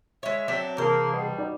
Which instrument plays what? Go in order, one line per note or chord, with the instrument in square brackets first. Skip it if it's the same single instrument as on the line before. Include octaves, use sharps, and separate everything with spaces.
[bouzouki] G#3 C#5 [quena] E5
[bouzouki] F#3 C4 D4
[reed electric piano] C3 E3 A5 [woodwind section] A#3 [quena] G#4 [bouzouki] C5
[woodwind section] B2 G3
[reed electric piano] D#4 D5